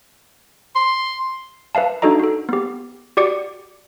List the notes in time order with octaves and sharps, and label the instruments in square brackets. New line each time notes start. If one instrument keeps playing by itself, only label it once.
[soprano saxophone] C6
[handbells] B4 E5 F5 A5
D4 D#4 F#4 A4 D#5 A#5
F#4 A4
B3 G4
F#4 G4 D5 D6 C#7